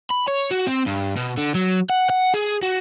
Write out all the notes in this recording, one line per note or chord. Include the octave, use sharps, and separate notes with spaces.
B5
C#5
F#4
C4
G2
B2
D3
F#3
F#5
F#5
G#4
F#4